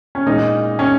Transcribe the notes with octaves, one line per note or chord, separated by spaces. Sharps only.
C#4
A#2 G#3 D#4
C#4